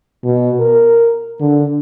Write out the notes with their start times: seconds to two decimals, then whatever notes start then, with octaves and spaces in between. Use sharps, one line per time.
0.24 B2
0.60 A#4
1.41 D3